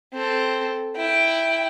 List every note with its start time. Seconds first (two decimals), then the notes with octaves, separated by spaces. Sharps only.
0.12 C4 A4
0.96 E4 G5